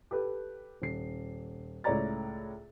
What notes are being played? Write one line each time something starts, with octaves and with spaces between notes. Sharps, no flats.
G4 A4 B4
D#1 C7
C#2 A2 C#5 D5 A#5 A6